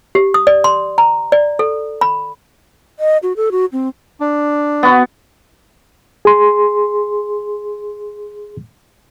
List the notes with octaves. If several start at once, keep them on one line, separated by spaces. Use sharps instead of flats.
G4
D#6
D5
C6
A#5
D5
A4
B5
D#5
F#4
A4
F#4
C4
D4
B3 F#4
G#4 C6